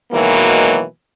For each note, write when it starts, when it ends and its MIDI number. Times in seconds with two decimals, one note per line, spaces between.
0.12 0.83 47
0.12 0.83 51
0.12 0.83 52
0.12 0.83 54
0.12 0.83 56
0.12 0.83 58